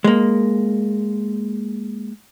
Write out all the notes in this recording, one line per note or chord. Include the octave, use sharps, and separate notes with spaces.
G#3 A#3